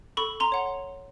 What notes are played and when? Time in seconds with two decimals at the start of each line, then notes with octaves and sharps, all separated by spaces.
0.17 A4 B5 C#6
0.40 A#5 C6
0.52 C#5 F#5